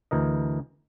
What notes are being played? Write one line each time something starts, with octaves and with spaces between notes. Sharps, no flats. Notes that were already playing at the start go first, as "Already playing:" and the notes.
D2 E3 A#4 D#5